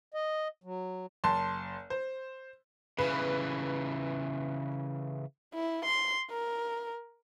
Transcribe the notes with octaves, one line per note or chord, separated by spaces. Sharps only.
D#5
F#3
F#1 A5 C6
C5
C#3 E3 B4
E4
C6
A#4